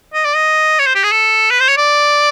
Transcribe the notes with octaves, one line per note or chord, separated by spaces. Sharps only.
D#5
D5
D#5
C#5
C5
G4
G#4
A4
B4
C5
C#5
D5